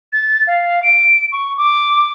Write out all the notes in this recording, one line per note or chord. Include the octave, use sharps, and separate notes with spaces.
A6
F5
D7
C#6
D6